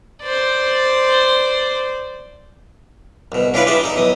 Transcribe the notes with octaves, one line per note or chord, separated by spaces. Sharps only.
C5 D5
C2 B2
C#4 D4 E4 F4 B4 D5
E3 G3 G4 G#4 E5 A5
D#4 A4
B1 E3 D#6